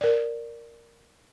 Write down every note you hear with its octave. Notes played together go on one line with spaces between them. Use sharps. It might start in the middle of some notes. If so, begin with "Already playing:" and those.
A#4 D5